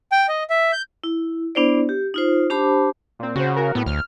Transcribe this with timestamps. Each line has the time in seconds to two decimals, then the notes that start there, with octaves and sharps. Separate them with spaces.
0.12 G5
0.29 D#5
0.50 E5
0.73 G6
1.04 E4
1.55 B3 D4 E4 C5 D5
1.89 G4
2.14 D#4 F4 C5
2.50 D4 G4 C5 A5 B5 D6
3.19 A#2 C4
3.36 C#3 F#4 C5
3.56 F#4 A#4
3.75 A2 B3
3.86 D2 F6